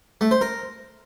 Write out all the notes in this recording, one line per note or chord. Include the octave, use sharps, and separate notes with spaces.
A3
C5
A#4